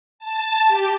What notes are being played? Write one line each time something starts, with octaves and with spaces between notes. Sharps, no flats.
A5
G4